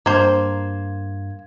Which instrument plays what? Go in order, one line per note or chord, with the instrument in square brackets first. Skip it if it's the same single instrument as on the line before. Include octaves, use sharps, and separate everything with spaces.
[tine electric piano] G2 G#6 [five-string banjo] A#3 C5